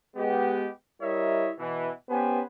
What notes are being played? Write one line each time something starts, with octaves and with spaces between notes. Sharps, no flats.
G#3 B3 G4
G3 E4 A#4 C#5 D#5 E5
B2 E3
B3 C#4 G4 B4 C5 G#5